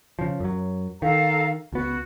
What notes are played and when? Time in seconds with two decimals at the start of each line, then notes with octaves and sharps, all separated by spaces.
0.19 C#3 F3
0.40 F#2 F#3
1.02 D#3 A4 F5 A#5
1.72 C#2 B3 F#4